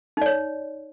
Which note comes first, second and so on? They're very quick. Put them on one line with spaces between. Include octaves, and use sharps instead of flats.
D#4 D5 C#5